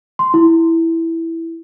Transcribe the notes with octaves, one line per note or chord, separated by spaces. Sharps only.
C6
E4